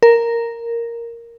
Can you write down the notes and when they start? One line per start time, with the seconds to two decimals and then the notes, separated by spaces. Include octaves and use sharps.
0.03 A#4